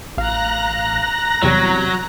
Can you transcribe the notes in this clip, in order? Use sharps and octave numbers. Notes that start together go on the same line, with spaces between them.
A1 F5 A#5 F#6 A#6
E2 C3 F#3 G3